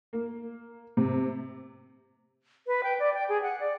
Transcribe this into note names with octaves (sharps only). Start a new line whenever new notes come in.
A#3
C3
B4
G5
D5
G5
G#4
F#5
D5